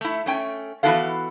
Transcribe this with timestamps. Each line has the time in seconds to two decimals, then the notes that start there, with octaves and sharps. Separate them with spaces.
0.01 A3 E4
0.26 A3 C#4 G5
0.83 E3 B3 E4 F#4 A4 F5